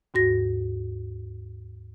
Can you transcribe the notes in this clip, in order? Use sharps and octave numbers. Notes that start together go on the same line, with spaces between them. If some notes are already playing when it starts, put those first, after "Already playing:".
D#2 G#2 F#4 A#6